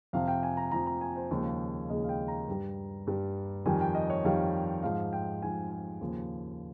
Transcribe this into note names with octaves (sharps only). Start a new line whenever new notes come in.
F2 C3 F3 F5
G5
G#5
A#5
F2 C3 F3 A#5
A#5
G#5
C5
D#2 C#3 F3 G#3
D#2 C#3 F3 G#3 D#5
F5
G5
A#5
G2 G3
G2 G3
F2 D#3 G3 G#5
G5
D#5
C#5
F2 D#3 G3 F5
G#2 F3 G#3 F5
G5
G#2 F3 G#3 G#5
G#5
D#2 C#3 F3